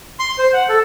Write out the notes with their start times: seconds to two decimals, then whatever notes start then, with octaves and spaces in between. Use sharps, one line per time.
0.19 C6
0.38 C5
0.53 F#5
0.69 A4